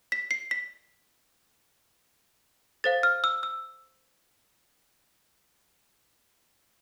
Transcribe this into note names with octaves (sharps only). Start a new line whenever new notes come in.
B6
C7
B6
A4 C5 F5 A6
F6
E6
E6